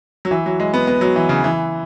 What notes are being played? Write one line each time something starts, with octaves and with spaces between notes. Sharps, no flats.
F#3
E3
F#3
G#3
B3
B3
F#3
E3
C#3
E3